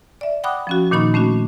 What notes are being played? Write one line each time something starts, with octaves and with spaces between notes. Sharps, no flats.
D5 E5
F#5 G5 B5 D6 D#6 F#6
F3 C#4 F#4
A#2 D#3 A#3 D#4 B5 C#6
A3 C#4 D4 F#4